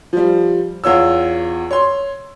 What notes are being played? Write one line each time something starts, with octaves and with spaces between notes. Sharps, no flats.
F3 G3
E2 F4 C#5 E6
C#5 C6